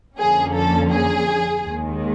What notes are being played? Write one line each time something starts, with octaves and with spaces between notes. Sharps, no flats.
F2 D3 F3 A#3 C#4 G#4
A4
G#4
D#2 D#3 G#3